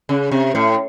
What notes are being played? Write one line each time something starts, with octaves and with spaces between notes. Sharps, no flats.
C#3
C3
A2